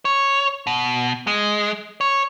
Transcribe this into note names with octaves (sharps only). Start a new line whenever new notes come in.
C#5
B2
G#3
C#5